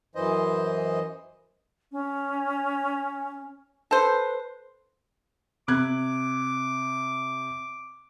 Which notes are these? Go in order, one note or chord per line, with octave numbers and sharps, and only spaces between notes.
F#2 E3 C5 D#5
C#4
A4 B4 C5
C3 D6 F#6 G#6